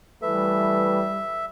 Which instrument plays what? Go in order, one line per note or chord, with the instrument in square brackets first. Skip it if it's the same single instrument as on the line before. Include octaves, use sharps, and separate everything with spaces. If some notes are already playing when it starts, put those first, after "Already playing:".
[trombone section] E3 A3 B4 [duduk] G3 [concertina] E5